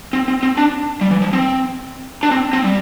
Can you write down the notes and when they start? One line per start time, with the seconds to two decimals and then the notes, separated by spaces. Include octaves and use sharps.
0.13 C4
0.28 C4
0.43 C4
0.57 D4
1.01 G3
1.11 E3
1.22 F3
1.33 C4
2.23 D4
2.31 C4
2.53 C4
2.64 G3